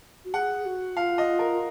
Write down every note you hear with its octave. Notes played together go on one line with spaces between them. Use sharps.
F#4
G#4 F#5
F#4
F4 F5
D#5
A#4